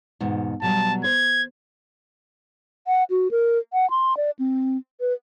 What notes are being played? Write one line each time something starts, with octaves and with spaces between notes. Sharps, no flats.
E2 G#2 B2
B2 F#3 G3 A5
C5 G#6
F#5
F#4
A#4
F#5
C6
D5
C4
B4